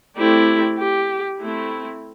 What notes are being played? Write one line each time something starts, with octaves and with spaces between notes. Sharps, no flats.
A3 C4 E4 G4 D5
G4
A3 C4 E4